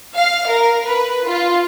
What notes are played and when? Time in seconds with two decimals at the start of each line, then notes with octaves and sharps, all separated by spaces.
0.15 F5
0.49 A#4
0.86 B4
1.26 F4